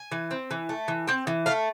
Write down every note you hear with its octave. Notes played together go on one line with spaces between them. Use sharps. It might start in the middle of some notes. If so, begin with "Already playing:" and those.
Already playing: G#5
E3
C4
E3
A3
E3
C4 G5
E3
A3 F5